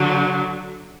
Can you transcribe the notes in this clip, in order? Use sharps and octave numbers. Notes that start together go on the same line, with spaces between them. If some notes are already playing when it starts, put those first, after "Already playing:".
Already playing: D3 F#3